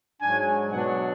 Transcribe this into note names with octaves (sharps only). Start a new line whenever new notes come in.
G#2 F#3 D4 G#5
B2 F#3 B3 D4 F#5